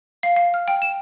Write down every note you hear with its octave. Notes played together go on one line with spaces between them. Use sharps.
F5
F5
F6
G5
E7